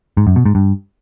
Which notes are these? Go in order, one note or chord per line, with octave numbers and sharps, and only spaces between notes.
G#2
F#2
B2
G#2
G2